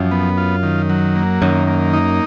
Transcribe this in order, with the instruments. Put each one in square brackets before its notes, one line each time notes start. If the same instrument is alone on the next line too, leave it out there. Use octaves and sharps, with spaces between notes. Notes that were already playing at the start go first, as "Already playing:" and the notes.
Already playing: [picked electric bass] F#2 [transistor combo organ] F3
[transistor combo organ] B3
F4
D#3
F#3
A#3
[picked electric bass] F#2 [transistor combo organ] D#3
[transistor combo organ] A#3
D#4